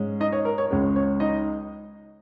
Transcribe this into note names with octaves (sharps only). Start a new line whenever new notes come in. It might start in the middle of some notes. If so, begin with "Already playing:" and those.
Already playing: G#2 G#3 C#4
D#4 D#5
C#5
A#4
C#5
C#2 C#3 G#3 C#4 C#5
C#5
D#4 D#5